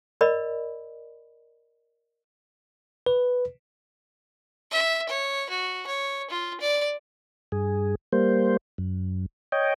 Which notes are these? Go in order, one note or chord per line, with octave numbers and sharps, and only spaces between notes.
A#4 D5 D#5 B5
B4
E5
C#5
F#4
C#5
F4
D5
G2 G#4
G3 A#3 C5
F#2
C#5 D#5 G5